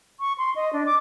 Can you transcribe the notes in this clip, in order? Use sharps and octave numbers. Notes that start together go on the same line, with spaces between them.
C#6
C6
D#5
D4
D6